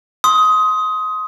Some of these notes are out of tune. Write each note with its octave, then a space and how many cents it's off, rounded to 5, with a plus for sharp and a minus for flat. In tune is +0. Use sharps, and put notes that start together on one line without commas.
C6 +0 D#6 +20